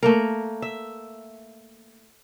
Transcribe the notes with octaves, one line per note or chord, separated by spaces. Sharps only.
A3 A#3 A#4
E5